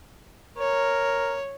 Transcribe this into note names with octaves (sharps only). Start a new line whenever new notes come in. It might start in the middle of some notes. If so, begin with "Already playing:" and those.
A#4 C#5